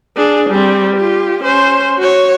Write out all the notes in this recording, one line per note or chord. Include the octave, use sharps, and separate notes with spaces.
D4 G#4
G3 C4
F4 G4
C#4 C5
F#4 C#5